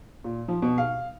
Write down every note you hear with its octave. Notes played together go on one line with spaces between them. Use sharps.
A#2
F3
B2
F5